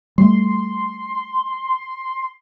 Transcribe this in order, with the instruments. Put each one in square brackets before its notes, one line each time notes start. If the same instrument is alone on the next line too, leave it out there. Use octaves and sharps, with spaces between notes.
[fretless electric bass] G3 A3 [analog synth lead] C6